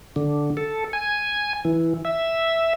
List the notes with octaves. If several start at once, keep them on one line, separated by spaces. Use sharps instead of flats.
D3
A4
G#5
E3
E5